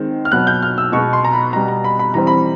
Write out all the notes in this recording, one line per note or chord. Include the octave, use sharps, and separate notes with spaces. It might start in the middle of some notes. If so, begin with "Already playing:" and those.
Already playing: D#3 G#3 C4
F6
B2 F#3 B3 F#6
G6
F6
E6
B2 G#3 B3 C#6
C6
A#5
B5
B2 G3 B3 A#5
A#5
B5
B5
E3 G3 C4 A#5
B5